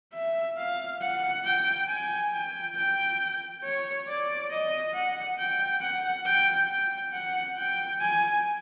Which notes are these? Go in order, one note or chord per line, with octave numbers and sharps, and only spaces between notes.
E5
F5
F#5
G5
G#5
G5
G5
C#5
D5
D#5
F#5
G5
F#5
G5
G5
F#5
G5
G#5